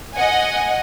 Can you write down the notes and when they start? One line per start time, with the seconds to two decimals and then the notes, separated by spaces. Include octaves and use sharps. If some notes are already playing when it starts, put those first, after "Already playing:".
0.15 D#5 F#5 G#5